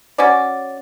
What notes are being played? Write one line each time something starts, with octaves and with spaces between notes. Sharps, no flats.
C#4 F#4 D5